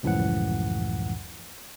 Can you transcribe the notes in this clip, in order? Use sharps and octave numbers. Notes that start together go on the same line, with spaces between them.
C#2 F#2 A2 E3 F3 F#5